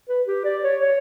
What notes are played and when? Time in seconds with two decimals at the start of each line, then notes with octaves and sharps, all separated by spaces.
0.09 B4
0.27 G4
0.45 D5
0.63 C#5
0.81 C#5